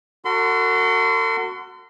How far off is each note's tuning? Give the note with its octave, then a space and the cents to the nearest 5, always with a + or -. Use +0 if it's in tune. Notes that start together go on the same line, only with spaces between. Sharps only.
F#4 +0 A4 +45 C6 -30